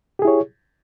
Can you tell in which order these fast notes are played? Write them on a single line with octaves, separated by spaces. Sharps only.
G4 G#4 E4 C#5